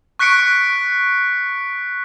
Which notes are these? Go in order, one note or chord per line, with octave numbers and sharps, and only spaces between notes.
C#6 F#6 B6 C#7 D7